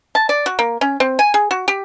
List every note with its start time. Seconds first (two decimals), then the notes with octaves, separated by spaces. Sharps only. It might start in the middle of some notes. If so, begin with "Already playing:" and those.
0.15 A5
0.29 D5
0.46 F#4
0.59 A#3
0.81 C#4
1.00 C4
1.19 G#5
1.34 G#4
1.51 F#4
1.68 G4